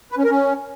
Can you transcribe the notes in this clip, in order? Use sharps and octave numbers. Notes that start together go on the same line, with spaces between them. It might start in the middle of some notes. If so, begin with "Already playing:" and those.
B4
C#4
A#4
C#4